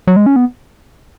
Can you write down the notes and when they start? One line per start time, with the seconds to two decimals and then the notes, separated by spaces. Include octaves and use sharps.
0.07 F#3
0.16 G#3
0.26 C#4
0.36 B3